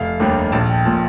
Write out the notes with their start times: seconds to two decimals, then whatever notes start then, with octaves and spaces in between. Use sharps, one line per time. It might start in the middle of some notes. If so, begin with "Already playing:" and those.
Already playing: F1 F5
0.20 D#2 D#3 G3 D4
0.52 A#1 A5
0.70 G5
0.85 A#2 F3 A5